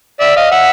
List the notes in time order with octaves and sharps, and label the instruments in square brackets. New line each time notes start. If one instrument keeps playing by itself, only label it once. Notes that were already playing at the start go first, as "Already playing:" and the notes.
[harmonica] D5 E5
D#5 F5
E5 F#5